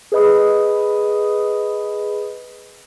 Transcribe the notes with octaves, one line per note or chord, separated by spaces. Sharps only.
G#4 B4 D#5 B5 D#6